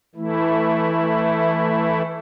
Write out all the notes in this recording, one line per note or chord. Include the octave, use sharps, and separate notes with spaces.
E3 A3 E4